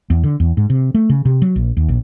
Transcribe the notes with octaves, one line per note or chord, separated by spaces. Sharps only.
E2
D3
E2
G#2
C3
A3
C#3
C3
F#3
A#1
D#2
A#1